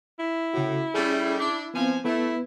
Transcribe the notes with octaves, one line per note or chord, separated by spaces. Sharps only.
E4
A2 C#3 F#4
G3 A3 C#4 G#4
D4
F3 B3 C4 G#5
A3 B3 E4 B4